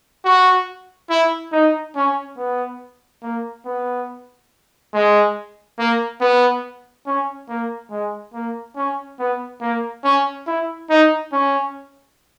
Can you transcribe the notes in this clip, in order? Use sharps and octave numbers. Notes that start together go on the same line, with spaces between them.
F#4
E4
D#4
C#4
B3
A#3
B3
G#3
A#3
B3
C#4
A#3
G#3
A#3
C#4
B3
A#3
C#4
E4
D#4
C#4